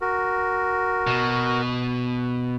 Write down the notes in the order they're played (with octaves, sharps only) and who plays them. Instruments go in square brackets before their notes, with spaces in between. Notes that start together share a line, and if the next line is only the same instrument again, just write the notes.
[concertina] F#4 A#4
[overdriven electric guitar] B2